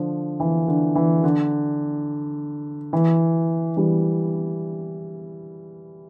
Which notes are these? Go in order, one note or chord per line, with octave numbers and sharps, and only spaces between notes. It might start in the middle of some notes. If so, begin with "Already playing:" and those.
Already playing: D3 F3
E3
D3
E3
D3
E3
E3 G3